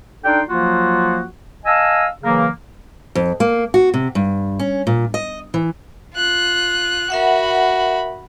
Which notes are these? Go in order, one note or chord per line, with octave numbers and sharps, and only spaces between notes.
D4 D#4 A4 D5 G5 C6
F3 F#3 A#3 F4 F#4
D#5 F5 G#5 A5 E6
C#3 E3 F#3 A#3
F2
A#3
F#4
C3
G2
C#4
A#2
D#5
E3
F4 F#6
F#4 A#4 E5 F#5 B5